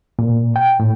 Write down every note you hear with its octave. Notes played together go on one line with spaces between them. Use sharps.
A#2
G5
A2